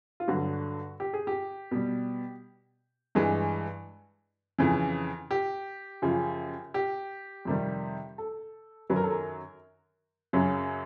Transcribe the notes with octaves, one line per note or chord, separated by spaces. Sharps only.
F4
G2 D3 F#3 F#4
G4
G#4
G4
B2 G3
G2 E3 G#3
F2 C#3 E3
G4
F#2 C#3 F3
G4
F2 C3 D#3 G3
A4
F#2 D#3 F#3 B4
A#4
A4
A#4
F#2 C#3 F#3